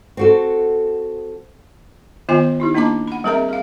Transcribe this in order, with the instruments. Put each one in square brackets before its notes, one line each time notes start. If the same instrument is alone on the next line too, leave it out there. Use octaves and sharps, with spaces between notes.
[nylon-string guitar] C4 F#4 A4
[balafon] D#3 B3 F4 D#5 G#5
D#4 E4 G4
A#3 D4 D#5 A5 A#5 D6
F#5 B5
G3 C4 G#4 A#4 E5 A#5
G#4 F5